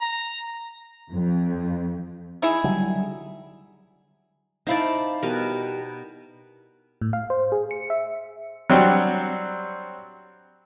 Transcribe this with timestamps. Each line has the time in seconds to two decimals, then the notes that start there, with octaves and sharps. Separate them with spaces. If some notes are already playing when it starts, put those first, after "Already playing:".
0.01 A#5
1.12 F2
2.42 D#4 E4 G#4
2.64 D3 F#3 G3
4.67 D#4 E4 C5 D5 F5 A5
5.23 B2 G3 A#4 B4
7.01 A2
7.13 F5
7.30 C5
7.52 G#4
7.71 C#7
7.90 E5
8.70 F#3 G3 C4 D4 F#4